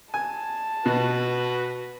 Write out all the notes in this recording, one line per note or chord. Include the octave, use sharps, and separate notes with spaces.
G#5 A5
B2 F#4 B4